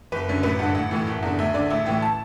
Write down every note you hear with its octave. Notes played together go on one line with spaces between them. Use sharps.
F#1 B4
F#2 D3
A1 B4
G2 D3 F#5
A1 F#5
A2 E3
F#1
E2 D3
D2 E5
D3 D5
A1 E5
A2 E3 G5
A5